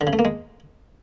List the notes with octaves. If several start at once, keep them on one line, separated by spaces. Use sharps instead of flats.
D3
C#3
A3
A#3
G#3